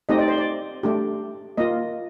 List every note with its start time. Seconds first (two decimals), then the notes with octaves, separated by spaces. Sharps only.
0.09 A3 C4 D#4 G4 D#5
0.19 D5
0.28 C5
0.38 D5
0.83 A3 D4 G4
1.57 A#3 F4 D#5